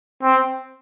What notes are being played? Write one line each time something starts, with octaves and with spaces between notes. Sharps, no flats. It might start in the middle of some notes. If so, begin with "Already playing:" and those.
C4